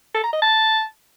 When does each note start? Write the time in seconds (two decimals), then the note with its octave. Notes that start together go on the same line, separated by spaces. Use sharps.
0.14 A4
0.24 A#5
0.33 D#5
0.42 A5